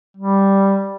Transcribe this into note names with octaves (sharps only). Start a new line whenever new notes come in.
G3